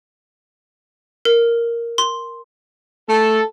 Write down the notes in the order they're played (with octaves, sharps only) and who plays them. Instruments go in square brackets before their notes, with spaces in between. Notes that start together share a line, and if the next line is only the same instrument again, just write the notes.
[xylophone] A#4
C6
[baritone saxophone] A3 [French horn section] A4